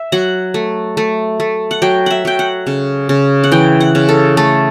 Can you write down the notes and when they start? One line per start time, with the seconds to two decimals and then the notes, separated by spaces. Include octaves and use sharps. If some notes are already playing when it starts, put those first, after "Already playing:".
Already playing: E5
0.12 F#3 F#5
0.54 A3
0.97 A3
1.40 A3
1.71 F#5
1.82 F#3 G5
2.06 E5 F#5
2.25 F#3 G5
2.39 F#5
2.67 C#3
3.09 C#3
3.44 F#5
3.52 E3 G5
3.80 F#5
3.95 C#3
4.09 A4
4.37 A3 A4